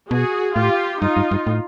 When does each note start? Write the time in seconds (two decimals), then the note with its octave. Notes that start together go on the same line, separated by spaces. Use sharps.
0.10 B2 F#4 G#4
0.56 A2 F4 G4
1.01 G2 D#4 F4
1.17 G2
1.31 G2
1.47 A2